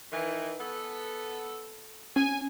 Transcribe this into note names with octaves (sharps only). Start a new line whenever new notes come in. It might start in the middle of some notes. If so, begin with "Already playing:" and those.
D#3 E3
B3 A4
C#4 G#5